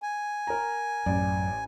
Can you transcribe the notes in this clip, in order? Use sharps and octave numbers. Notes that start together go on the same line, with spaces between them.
G#5
A#4 A#5
A1 F#2 D5